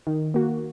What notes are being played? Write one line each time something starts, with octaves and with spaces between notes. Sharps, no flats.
D#3
A#3 F#4